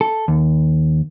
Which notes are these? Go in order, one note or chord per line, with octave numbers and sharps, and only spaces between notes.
A4
D#2